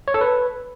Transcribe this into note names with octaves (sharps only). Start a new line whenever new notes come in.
C#5
A4
B4